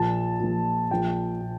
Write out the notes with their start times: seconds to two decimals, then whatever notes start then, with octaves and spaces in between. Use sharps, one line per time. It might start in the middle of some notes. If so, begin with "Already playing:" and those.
Already playing: A#1 A#2 A5
0.40 A#1 A#2
0.91 A#1 A#2 G5
1.41 A#2